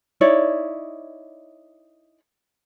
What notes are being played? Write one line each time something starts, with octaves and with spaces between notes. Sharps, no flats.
D#4 E4 C#5 D5